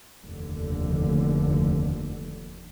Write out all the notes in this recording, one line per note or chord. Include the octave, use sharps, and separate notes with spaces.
F1 D#2 D3